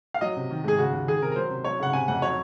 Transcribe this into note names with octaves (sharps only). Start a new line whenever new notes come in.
F5
F#3 D#5
C3
D#3
G#2 G#4
C#3 F#4
D#2
D#3 G#4
C3 A#4
A#4
F#3 C5
C3
F#3 C#5
C#3 F#5
C3 G#5
F2 F#5
F#3 C#5